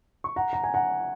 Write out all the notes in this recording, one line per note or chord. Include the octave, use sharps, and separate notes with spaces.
C#6
F#5 A#5
A#5
G#5
F#5 A#5